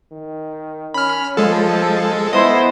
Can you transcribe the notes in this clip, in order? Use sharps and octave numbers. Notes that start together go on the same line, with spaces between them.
D#3
C#4 B5 F6
F3 G#3 A4
B3 E4 C5 D#5